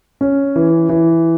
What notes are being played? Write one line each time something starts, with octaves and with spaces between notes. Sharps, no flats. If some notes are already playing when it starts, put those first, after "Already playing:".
C#4
E3
E3